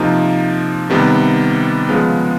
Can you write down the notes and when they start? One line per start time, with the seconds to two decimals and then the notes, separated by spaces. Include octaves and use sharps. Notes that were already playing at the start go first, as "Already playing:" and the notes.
Already playing: C3 F3 A#3 D#4
0.90 C3 D#3 G3 B3
1.89 C#3 F3 G#3 B3